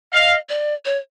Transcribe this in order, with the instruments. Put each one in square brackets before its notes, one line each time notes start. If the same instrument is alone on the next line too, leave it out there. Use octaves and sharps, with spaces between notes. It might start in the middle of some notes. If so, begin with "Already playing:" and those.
[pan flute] D#5 [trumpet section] F5
[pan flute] D5
C#5